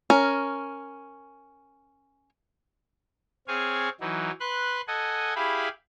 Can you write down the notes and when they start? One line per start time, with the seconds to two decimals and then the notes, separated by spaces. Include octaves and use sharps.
0.10 C#4 A#4
3.48 C4 G#4 C#5 F5 G#5
4.01 E3 F#3 D#4
4.40 B4 C6 F#6
4.88 A4 D#5 F#5 G#5
5.35 E4 G4 G#4 F5 B5